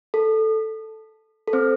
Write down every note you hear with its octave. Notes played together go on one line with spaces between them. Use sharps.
A4
A4
C4 C5